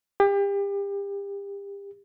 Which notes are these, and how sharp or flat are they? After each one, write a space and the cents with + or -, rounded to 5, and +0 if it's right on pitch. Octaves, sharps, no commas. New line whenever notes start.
G4 +35